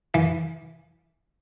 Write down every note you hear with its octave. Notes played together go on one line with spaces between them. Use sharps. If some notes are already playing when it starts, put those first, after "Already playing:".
E3